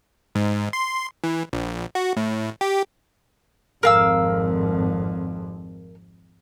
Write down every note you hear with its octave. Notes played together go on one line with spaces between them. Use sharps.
G#2
C6
E3
A#1
F#4
A2
G4
G#1 F2 A#4 F5 E6